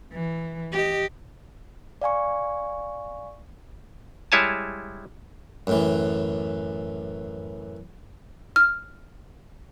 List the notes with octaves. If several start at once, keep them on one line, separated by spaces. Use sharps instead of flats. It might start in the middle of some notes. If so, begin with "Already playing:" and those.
E3
G4 D#5
D5 F5 G#5 C#6
G3 G#3 E4 C#5 G#5 A5
F#2 A2 E3
F6